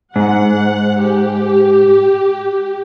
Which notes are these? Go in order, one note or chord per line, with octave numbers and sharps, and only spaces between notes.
G#2 F#5
G4